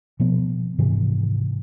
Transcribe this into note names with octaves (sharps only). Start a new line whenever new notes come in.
B2 F3 B3
G#2 C3 D#3 E3